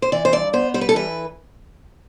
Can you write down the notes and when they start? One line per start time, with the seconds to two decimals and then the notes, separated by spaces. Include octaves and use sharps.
0.02 C5
0.12 E3 D5
0.25 C5
0.32 G2 D5
0.53 B3 C5
0.74 G3 C5
0.81 B4
0.89 A4
0.95 E3 B4